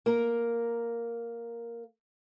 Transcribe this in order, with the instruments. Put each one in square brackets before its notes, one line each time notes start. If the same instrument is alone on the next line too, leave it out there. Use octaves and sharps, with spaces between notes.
[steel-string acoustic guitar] A#3 A#4